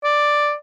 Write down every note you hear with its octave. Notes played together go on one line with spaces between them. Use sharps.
D5